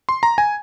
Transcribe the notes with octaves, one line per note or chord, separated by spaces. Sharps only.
C6
A#5
G#5